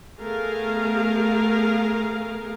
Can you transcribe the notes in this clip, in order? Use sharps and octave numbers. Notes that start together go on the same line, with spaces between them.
A3 B3 G#4 A#4 F5